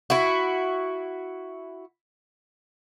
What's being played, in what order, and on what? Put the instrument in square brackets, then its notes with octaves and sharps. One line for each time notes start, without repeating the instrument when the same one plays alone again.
[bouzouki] E4 F#4